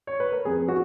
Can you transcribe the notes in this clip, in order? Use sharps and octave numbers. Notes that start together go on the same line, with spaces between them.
C#5
B4
A#4
F2 G#4
F#4